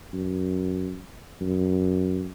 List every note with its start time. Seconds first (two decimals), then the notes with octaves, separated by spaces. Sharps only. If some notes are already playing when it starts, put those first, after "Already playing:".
0.13 F#2
1.41 F#2